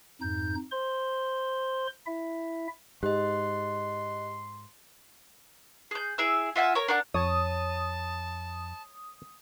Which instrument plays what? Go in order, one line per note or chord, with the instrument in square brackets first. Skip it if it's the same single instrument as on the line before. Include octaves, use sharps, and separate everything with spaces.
[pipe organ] F2 G#2 D#4 G6
C5 C6
E4 E5
[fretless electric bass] G#2 [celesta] G4 [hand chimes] D#5 F#6 [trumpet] C6
[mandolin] G#4 G6
E4 G#4 E5 E6
F4 E5 F#5 G#5
A#4 C#5
D4 A#4 D5 F#5
[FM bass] F2 [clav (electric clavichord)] C#5 [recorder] A5 [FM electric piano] D#6